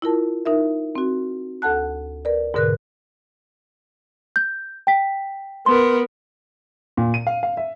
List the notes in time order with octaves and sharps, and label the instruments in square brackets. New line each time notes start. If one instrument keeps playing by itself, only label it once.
[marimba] E4 F4 A#4 A5
D#4 A#4 E5
C4 F#4
D2 A4 F#5 A5 F#6
A#4 B4 D5
G#2 B2 D3 A#4 B4 F#6
[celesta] G6
G5 B6
[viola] B3 A#4 [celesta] C6
[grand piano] A#2
D#7
F5
F5
E5